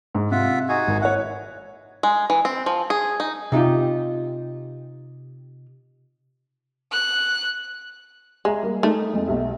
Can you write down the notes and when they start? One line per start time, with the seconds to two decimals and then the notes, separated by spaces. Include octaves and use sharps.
0.15 G#2
0.32 C3 F4 E5 F#5
0.69 D#4 F#4 G#4
0.87 G#1
1.02 E4 C#5 F#5
2.03 G#3
2.30 E3
2.45 C4
2.66 F3
2.90 G#4
3.20 D#4
3.52 C3 D#4 F4 G4
6.92 F#6
8.45 G#3 E5 A#5
8.63 G3 A#3
8.83 G#3 A3 D#4
9.13 F2 G#3
9.27 B1 G4 E5